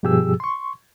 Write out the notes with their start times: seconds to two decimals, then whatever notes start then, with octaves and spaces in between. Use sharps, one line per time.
0.03 G2 B2 F3 G4 G#4 E6
0.40 C6 C#6